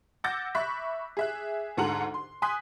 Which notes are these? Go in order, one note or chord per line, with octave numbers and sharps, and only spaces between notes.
F#5 D6 E6 G6 A6 A#6
E5 B5 C#6 F#6 B6
G#4 E5 F#6
D2 G#2 A4 F#5 A#5 F#7
C6
G#5 C6 D#6 F#6 B6